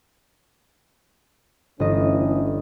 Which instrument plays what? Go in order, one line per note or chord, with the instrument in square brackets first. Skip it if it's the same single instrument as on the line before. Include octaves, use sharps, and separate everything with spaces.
[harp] G1 D#5 [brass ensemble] E3 A3 C#4